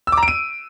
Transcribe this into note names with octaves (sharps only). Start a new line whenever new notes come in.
E6
D6
A#5
D7
D#7